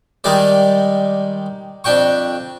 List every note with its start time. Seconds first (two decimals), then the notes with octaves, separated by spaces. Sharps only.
0.24 D#3 G3 G#3 D5
1.84 F2 D4 G5 C#6